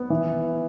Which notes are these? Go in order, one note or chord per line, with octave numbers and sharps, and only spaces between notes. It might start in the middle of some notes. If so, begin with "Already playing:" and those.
Already playing: B3
E3